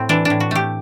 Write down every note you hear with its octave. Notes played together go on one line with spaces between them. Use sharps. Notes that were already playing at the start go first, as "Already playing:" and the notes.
Already playing: A2 C4
E3 D4
A2 D4
F#4
A3 G4